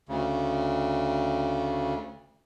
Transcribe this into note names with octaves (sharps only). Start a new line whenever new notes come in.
D2 C#3